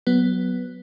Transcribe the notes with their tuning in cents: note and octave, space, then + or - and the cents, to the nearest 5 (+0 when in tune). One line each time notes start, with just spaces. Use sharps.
F#3 +0 B3 +0